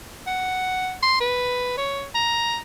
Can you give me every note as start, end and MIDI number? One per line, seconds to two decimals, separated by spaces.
0.27 0.94 78
1.03 1.16 84
1.20 1.75 71
1.77 2.06 73
2.15 2.58 82